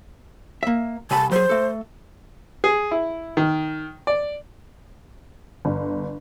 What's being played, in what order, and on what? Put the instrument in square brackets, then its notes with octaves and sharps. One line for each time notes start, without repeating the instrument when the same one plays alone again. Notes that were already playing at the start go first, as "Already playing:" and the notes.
[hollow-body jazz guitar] A#3 E5
[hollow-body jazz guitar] C2 G#5 B5 [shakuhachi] A5
[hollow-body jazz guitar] F#3 G#4 [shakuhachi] C5
[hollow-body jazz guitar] A3 A4
[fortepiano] G#4
E4
D#3
D5
[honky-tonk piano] G1